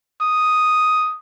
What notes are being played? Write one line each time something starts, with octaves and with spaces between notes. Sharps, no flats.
D#6